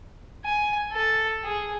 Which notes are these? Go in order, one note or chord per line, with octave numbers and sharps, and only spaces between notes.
G#5
A4
G#4